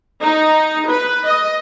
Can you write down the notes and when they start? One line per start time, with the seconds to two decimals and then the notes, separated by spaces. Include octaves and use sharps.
0.22 D#4
0.89 B4
1.25 D#5